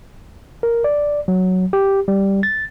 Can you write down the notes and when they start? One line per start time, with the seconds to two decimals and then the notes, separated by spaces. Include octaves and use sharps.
0.63 A#4
0.84 D5
1.28 F#3
1.73 G4
2.08 G3
2.43 A6